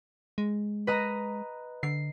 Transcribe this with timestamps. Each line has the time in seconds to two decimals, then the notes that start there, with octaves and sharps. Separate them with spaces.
0.38 G#3
0.87 B4 D#5 A#5
1.83 D3 C7